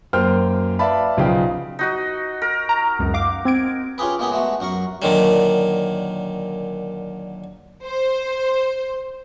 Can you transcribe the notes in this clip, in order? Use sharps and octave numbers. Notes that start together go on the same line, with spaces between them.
F#2 A#3 C5 G5 F6
B4 D5 E5 F5 A5 B5
B1 C#3 F3 D#4 F5 G5
D#4 F#4 D#5
A#4
A#5
C#2 F#2
F5 D6
C4 G#6 D7
C#4 F4 G4 G#4 B4
G#3 A#3 B3 G4 G#4
G#3 A3 B3 F#4
F#2 F#4 A#4 C#6
A#2 D3 D#3 F#3
C5